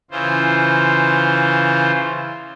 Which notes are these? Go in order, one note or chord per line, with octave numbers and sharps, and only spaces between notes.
C#3 E3 F4 C5